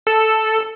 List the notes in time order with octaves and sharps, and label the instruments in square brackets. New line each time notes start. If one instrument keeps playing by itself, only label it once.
[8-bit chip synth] A4